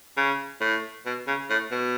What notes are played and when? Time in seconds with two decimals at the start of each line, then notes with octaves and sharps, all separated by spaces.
0.17 C#3
0.61 A2
1.06 B2
1.28 C#3
1.50 A2
1.71 B2